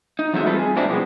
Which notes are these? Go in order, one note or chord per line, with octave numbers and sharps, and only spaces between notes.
D#4
E3 F#3 G#3 A3 C4 E5
G3 C4 F4 A4 B4
G#4
G#2 G#3 C4 D4 E4
B2 F3 F#3 G#3 A#3 B3